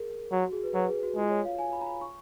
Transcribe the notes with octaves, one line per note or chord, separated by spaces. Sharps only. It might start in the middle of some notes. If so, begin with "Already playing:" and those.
Already playing: G#4 A#4
F#3 F#4
F#4
G#4
B4
F#3 B4
G#4
F#4
G#3 F4
C#5
F5
G#5
B5
A#5
B5
C#6